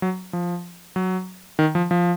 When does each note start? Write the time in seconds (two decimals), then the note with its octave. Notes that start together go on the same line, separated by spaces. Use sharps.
0.02 F#3
0.33 F3
0.96 F#3
1.59 D#3
1.75 F3
1.91 F3